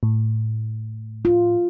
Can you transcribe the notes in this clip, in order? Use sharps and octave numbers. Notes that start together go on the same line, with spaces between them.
A2
F4